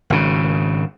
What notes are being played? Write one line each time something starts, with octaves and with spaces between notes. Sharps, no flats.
G#1 C#3